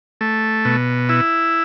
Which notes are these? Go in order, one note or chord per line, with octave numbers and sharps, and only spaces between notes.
A3
B2
E4